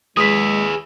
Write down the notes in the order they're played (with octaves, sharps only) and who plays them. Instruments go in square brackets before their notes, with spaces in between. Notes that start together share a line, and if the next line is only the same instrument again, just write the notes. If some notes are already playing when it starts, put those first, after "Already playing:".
[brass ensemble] G#3 [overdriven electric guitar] G#4 B4 [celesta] D#6 B6